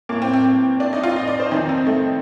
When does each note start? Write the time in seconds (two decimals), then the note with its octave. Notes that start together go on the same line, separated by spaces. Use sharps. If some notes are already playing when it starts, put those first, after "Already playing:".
0.09 A2 A#3
0.22 C4
0.33 C4
0.45 C4
0.80 D4
0.93 D#4
1.03 F4
1.16 D#5
1.27 D5
1.40 C5
1.51 F2 D#3 D#4
1.69 C4
1.87 A3